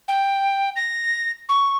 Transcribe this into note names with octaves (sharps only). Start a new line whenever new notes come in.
G5
A#6
C#6